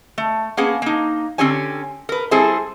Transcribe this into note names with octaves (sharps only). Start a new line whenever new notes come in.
A3
A#3 B3 C#4 G#4
A#3 D#4
D3 C4 C#4 G4 C#5 G#5
A#4 B4
G3 C4 E4 G#4 A4 C5